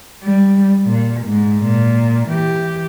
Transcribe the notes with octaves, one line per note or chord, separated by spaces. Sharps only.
G3
A#2
G#2
A#2
E3 G4